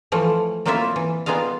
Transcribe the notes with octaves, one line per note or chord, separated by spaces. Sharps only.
E3 F3 A3
F#3 A#3 C4 E4 F4 E5
E3
G3 B3 D#4 F4 G#4 F5